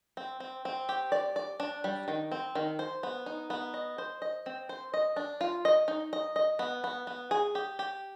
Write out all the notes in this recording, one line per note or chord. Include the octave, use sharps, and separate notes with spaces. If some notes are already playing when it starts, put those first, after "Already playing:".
C4
C4
C4
G4
D5
D5
D4
G3
D#3
C4
D#3
C5
B3
D#4
B3
D#5
C5
D#5
C4
C5
D#5
D4
F4
D#5
D#4
D#5
D#5
B3
B3
B3
G#4
G4
G4